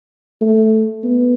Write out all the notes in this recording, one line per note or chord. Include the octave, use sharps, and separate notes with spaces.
A3
B3